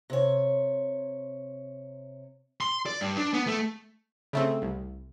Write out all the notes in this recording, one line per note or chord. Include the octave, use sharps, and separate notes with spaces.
C3 C#5
C6
D5
G2
D4
B3
A3
C#3 A3 C4
C2